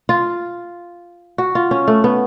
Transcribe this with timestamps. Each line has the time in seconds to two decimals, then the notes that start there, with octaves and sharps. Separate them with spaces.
0.09 F4
1.38 F#4
1.55 F4
1.71 C#4
1.87 A3
2.04 B3